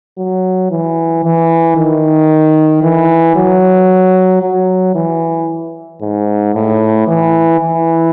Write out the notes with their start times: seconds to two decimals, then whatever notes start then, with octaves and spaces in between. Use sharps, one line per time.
0.18 F#3
0.71 E3
1.24 E3
1.77 D#3
2.83 E3
3.36 F#3
4.42 F#3
4.95 E3
6.02 G#2
6.54 A2
7.07 E3
7.60 E3